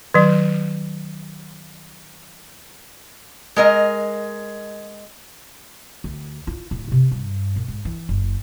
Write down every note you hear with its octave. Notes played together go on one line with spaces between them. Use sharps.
D#3 F#3
G#3 A#4 D#5
D2
F4
D1
C3
G2
A#2
G#2
E3
F#1